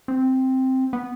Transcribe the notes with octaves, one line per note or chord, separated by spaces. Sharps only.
C4
B3